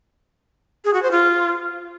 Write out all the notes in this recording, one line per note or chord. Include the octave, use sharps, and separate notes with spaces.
G#4
F#4
C5
F4